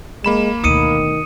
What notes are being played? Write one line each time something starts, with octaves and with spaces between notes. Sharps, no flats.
G#3 A#3 B5 E7
D2 B2 D#3 D#6 C#7 D#7